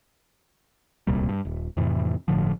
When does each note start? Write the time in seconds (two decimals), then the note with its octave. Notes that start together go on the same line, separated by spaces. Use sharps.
1.07 D1 C2 A#2 G3
1.29 G2
1.45 D#1
1.77 F2 A2 C3 E3
2.28 G1 A2 D3 F3